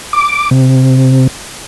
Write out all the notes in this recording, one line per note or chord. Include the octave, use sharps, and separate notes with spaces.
D6
C3